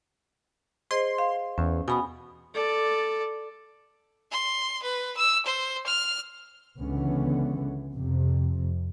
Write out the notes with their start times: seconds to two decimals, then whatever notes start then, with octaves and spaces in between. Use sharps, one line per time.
0.91 G#4 C5 D#5 C6
1.18 F5
1.58 E2 C#4
1.88 B2 G#5 B5 D#6
2.54 A4 D5
4.31 C6
4.83 B4
5.17 E6
5.46 C5
5.86 F6
6.78 C#2 D3 E3 B3 C#4
7.94 F2 C3